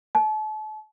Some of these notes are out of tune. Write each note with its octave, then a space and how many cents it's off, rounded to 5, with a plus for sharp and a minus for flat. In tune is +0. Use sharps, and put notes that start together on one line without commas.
A5 -35